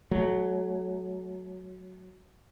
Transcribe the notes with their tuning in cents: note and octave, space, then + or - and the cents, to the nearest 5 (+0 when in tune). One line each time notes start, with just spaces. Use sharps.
F#3 +0 A3 -40